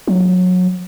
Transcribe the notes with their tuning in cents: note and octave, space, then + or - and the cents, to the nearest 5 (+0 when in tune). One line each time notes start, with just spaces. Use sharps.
F#3 -25